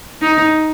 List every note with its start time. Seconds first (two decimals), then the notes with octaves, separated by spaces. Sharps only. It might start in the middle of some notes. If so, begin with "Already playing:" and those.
0.22 D#4